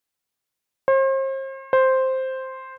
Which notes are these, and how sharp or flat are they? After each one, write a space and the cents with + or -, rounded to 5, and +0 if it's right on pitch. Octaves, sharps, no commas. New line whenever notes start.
C5 +40
C5 +0